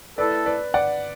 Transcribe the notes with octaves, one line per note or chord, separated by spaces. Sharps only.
A3 E4 A4 B4 D5
B4 D5
D5 F#5